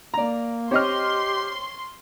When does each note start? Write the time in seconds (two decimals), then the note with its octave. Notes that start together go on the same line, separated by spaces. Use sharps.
0.14 A#3 D5 A#5
0.71 C4 G4 C#5 D#5 C6 F6